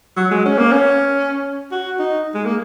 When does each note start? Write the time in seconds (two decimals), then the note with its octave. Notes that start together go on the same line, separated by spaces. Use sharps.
0.17 F#3
0.31 G#3
0.45 C#4
0.59 A#3
0.72 C#4
1.71 F#4
1.99 D#4
2.34 G#3
2.45 A#3